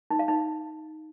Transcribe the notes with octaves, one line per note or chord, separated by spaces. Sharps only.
D#4
F5
D#4